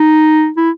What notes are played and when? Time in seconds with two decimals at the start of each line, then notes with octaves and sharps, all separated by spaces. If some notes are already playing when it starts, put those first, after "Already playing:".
Already playing: D#4
0.57 E4